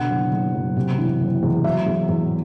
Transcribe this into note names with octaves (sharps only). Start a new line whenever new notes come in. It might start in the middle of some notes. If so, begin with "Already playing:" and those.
Already playing: B2 D3 F#5
F#1
F#1
F#2
C3
E3
F#1
E2
F#3 E5
E2
E2